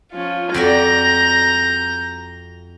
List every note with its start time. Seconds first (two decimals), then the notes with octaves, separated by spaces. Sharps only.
0.12 F3 C#4 F4
0.54 F2 F#4 D5 A#5 G6 A#6